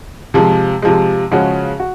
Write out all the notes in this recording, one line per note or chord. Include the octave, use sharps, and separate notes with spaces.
C3 F3 G#3
C3 F3 G#3
C#3 F3 G#3 C#4 F#4
F#4